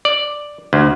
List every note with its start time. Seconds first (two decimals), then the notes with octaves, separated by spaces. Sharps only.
0.05 D5
0.73 D2